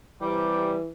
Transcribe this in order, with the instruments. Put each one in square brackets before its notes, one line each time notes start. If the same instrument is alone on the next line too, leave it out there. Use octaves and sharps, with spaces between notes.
[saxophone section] C3 G3 [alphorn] E3